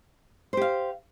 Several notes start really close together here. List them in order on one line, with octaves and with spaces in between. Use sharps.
C5 G4 F5